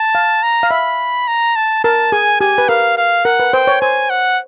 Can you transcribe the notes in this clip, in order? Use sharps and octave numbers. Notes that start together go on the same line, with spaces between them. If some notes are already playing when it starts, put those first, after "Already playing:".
Already playing: A5
F5
A#5
F5
E5 B5
A#5
A5
A#4 A5
G#4 G#5
G4 G#5
B4
A#4 F5
F5
A#4 F#5
B4
C5 G5
C#5
C5 G#5
F#5